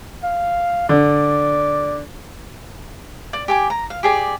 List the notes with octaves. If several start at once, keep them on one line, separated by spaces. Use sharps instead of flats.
F5
D3 D5
D5
G4 G#5 D6
A#5
F5
G4 G#4 D5